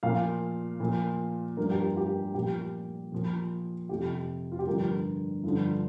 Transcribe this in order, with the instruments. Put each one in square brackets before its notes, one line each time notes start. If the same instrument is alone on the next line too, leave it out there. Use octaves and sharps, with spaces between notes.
[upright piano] A#2 F3 F5
A#2 F3
G2 F3 A#4
G4
F4
G4
A#2 F3 G4
A#2 F3
F2 C3 F3 G4
F4
G4
G2 D3 F3 A#4
G2 D3 F3